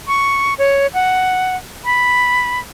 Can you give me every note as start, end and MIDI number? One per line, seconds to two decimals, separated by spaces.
0.07 0.54 85
0.58 0.87 73
0.94 1.56 78
1.85 2.60 83